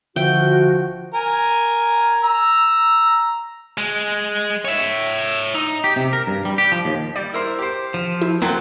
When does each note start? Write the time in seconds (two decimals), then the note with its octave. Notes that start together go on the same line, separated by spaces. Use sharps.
0.16 D3 F3 F#4 E5 G5
1.14 A#4 G#5
2.24 A#5 E6
3.78 G#3
4.65 C#5 E5
5.54 D#4
5.84 G4
5.96 C3
6.13 A#4
6.27 G2
6.45 G3
6.58 G4
6.72 F3
6.85 D#2
7.16 G3 D5
7.33 E4 A#4 C5
7.59 G4 C5
7.94 F3
8.21 E4
8.42 D2 F#3 A#3 C4 F#6